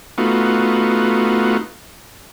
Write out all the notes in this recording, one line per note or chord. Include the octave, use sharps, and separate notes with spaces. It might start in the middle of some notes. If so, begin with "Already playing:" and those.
A3 B3 D#4 F4 F#4